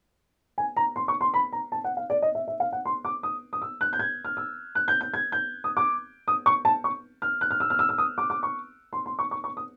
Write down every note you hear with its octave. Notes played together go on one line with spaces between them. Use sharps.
G#5
A#5
C6
C#6
C6
B5
A#5
A5
F#5
F5
D5
D#5
E5
E5
F5
F#5
C6
D6
D#6
D#6
E6
F#6
G6
G#6
F6
E6
F#6
G6
G6
G#6
G6
D#6
D6
D#6
C#6
A5
C#6
F6
F#6
F6
E6
F6
E6
E6
D#6
D6
D6
C#6
C6
C6
C#6
C#6
C#6
D#6